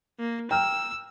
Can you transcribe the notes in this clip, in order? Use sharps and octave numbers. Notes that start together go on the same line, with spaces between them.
A#3
G5 A#5 E6 F6